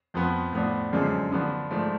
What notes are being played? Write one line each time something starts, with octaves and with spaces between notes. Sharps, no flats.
F2 F3 B3
A2 F3 B3 D4
F#2 D3 F3 G#3 D4
D3 F3 B3 D4
G#2 F3 A3 D4